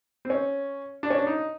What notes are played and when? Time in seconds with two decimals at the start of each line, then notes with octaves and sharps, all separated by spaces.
0.25 C4
0.30 C#4
1.03 D4
1.10 C#4
1.18 D4
1.27 D#4